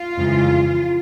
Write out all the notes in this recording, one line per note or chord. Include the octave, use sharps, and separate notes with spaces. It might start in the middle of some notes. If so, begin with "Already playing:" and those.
Already playing: F4
F2 C#3 E3 G#3